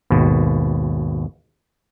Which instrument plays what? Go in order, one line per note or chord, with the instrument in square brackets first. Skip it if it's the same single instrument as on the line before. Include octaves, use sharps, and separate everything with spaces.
[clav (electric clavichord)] G#1 D#2 B2